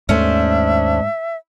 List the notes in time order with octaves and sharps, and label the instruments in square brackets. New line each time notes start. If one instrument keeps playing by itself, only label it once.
[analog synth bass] D#2 [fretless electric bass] G#2 A3 [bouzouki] C#4 D4 C5 [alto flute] E5